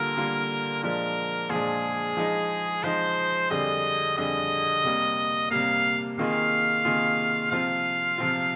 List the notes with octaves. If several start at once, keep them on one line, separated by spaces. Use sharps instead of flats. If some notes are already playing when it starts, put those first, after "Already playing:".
Already playing: D3 G3 A#3 F4 A#4
D3 G3 A#3 F4
A#2 F3 G#3 D4 A#4
A#2 F3 G#3 D4 G#4
F3 G#3 D#4
F3 G#3 D#4 C5
F2 D3 G3 D4 G#4 D#5
F2 D3 G3 D4 G#4 D#5
C3 G3 A#3
C3 G3 A#3 F5
C3 D#3 A#3 F4 G#4 F5
C3 D#3 A#3 F4 G#4
C3 F3 C4 F4 F5
C3 F3 C4 F4